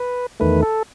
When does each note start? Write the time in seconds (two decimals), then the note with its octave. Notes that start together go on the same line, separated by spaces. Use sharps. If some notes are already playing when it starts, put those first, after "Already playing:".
Already playing: B4
0.40 E2 D#3 A3 B4
0.63 A4